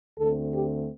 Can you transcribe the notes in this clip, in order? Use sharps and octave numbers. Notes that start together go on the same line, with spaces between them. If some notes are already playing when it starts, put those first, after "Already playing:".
D2 D3 A3 C4 A4
G4